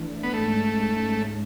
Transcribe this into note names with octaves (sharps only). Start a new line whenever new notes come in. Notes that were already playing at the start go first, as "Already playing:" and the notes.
Already playing: E3 A3 D4
B3
G#2 G#3 A3 C#4